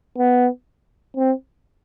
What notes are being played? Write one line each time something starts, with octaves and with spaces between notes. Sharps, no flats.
B3
C4